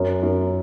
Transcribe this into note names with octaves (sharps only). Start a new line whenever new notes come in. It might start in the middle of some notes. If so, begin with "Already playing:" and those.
Already playing: F#2
F#2